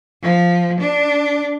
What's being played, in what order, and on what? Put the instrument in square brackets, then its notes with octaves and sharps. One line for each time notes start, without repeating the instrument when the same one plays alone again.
[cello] F3
D4